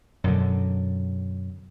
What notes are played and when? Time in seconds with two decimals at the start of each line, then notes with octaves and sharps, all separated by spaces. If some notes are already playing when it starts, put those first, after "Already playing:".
0.24 F#2 B2 D3